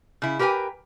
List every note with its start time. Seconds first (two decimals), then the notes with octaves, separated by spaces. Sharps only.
0.22 C#3 E4
0.39 G4 A#4 B4 G5 G#5